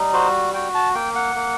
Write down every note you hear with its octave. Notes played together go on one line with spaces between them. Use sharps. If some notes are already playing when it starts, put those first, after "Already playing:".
Already playing: G3 D#4
F#4 C5
F#4 G5
A5
A#3 G5
F#5
A#3